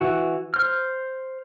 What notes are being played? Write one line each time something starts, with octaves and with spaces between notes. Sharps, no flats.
E3 F#4
C5 F6